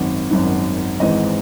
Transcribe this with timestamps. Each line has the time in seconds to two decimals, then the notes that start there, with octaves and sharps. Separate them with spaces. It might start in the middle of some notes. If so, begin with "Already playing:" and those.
Already playing: G#1 F#2 D#3
0.31 G#1 F#2 D#3
1.00 G#1 G#2 E3 D#5